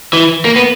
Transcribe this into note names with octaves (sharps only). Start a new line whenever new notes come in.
E3
A#3
B3